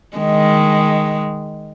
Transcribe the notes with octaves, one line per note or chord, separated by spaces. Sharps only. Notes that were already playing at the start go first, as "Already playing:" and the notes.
D#3 G#3